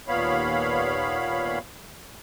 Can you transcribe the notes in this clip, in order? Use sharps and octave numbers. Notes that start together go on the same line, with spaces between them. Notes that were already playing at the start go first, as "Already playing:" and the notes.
D#2 A#2 B3 C#5 F5 B5